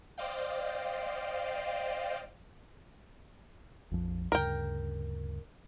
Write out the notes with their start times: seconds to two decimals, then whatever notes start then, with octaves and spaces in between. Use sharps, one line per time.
0.18 C5 D5 D#5 F5 G5
3.91 A#1 F2 F3
4.32 D2 G2 C#3 A#4 G5